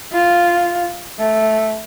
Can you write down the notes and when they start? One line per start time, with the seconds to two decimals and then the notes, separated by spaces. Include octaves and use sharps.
0.13 F4
1.19 A3